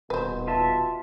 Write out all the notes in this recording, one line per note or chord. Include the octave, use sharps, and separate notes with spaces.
D#1 B2 B4 C5
F4 E5 A5